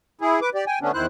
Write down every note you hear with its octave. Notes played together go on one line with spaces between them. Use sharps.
E4 G#4
B4 D6
G4 D5
G5 G#5
D3 A3 B3 C#4 D4
E2 D#3 E4 C5 F#6